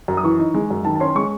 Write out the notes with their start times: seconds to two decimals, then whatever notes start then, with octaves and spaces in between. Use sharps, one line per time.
0.08 F#2
0.17 D#6
0.24 E3 C#6
0.39 D#4
0.54 G#3
0.70 F#2
0.85 D#3 A5
0.95 A5
1.00 C#4 C6
1.15 G#3 C#6